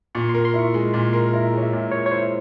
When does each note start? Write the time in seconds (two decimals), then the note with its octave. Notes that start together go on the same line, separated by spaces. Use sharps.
0.15 A#2 C#6
0.29 C6
0.34 A#4
0.45 C6
0.54 E4 C#6
0.74 G#3 C6
0.93 A#2 C6
1.13 A#4 C6
1.34 E4 A#5
1.53 G#3 C#5
1.63 E5
1.73 A#2
1.92 A#4 C#5
2.06 C#5
2.11 E4 C5